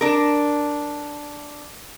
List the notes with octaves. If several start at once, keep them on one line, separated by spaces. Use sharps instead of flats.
D4 A#4